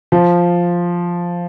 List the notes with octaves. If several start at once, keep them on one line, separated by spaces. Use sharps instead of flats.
F3